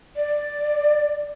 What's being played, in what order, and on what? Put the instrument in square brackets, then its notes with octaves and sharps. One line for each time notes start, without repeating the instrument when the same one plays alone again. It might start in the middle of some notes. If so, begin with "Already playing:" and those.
[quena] D5